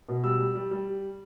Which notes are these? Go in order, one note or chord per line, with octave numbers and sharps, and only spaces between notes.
B2
G3 E6
G3
G3
G3